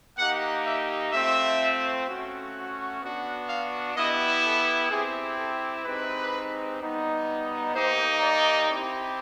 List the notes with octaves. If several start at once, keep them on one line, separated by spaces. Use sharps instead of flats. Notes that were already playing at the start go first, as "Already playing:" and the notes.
A#3 D#4 G4 F#5
E5
A3 C4 F4 E5
A3 C#4 F#4
B3 D4 F#4
F5
B3 E4 G4 D#5
A4
C4 E4 G4 G#4
A4
G#3 C4 D#4 G4 B4
G3 B3 D#4
A#3 D#4 G4 C5
D5
C4 E4 G4